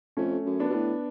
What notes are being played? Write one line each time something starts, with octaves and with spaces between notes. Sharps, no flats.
F2 A3 C#4
F#2
B3 D4
B2
A2